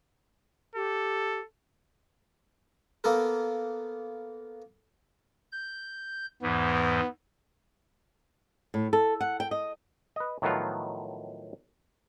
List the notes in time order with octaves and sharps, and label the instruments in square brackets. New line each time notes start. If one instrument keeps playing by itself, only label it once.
[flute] G4 [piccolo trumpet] A4
[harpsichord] A#3 B3 A4 A#4
[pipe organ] G6
[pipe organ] E2 G#2 E3 [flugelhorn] B3
[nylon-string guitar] A2
A4
F#5
G5
D#5
[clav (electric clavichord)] B4 D#5
A2 D#3 F3 F#3 B3 F4